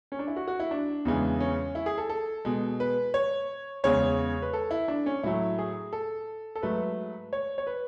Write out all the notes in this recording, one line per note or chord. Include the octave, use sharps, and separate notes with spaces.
C#4
D4
E4
F#4
F#4
E4
D4
E2 C#3 E3 G#3
C#4
E4
G#4
A4
A4
B2 G#3
B4
C#5
E2 C#3 G#3 C#5
B4
A4
E4
D4
C#4
A2 F#3 A3 E4
G#4
A4
A4
G#2 F#3 A3 B4
C#5
C#5
B4